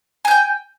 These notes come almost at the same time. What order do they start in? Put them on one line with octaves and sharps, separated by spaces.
G#5 G6 G5